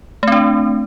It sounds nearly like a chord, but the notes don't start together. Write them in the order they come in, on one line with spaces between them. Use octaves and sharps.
A3 C4 D4